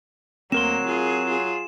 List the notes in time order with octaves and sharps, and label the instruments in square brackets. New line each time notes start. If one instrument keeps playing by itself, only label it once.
[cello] D2 A#3 [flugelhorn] F#3 [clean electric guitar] C4 A#4 C6 [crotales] E7
[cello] F4 G#4
F4 G#4